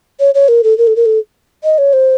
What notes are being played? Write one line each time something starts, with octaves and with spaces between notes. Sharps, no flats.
C#5
C#5
A#4
A4
A#4
A4
A#4
A4
D#5
C#5
C5